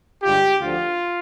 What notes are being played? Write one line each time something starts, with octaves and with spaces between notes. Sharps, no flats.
G2 D3 G#3 D4 F4 G4
D2 D3 F3 F4